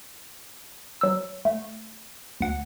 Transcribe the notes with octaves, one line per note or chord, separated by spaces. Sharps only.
F#3 E6
A3
D2 F#5